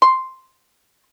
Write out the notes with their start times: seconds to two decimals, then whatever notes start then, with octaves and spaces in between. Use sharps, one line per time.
0.02 C6